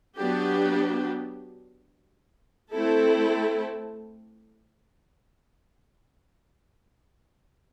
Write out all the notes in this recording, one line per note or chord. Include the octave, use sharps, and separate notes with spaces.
F#3 B3 D4 G4
A3 C4 E4 A4